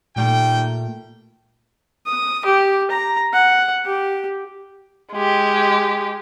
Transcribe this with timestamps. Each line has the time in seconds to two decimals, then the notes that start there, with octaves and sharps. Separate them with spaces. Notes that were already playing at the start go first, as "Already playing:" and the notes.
0.16 A#2 D#3 G3 A3 G5
2.06 D#6
2.45 G4
2.91 A#5
3.33 F#5
3.85 G4
5.13 G#3 G4